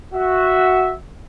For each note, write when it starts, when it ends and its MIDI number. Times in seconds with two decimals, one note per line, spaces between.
0.14 0.94 66
0.14 0.94 76